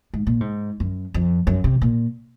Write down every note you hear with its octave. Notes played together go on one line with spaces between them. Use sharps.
G#2
A#2
G#2
F#2
F2
F#2
C3
A#2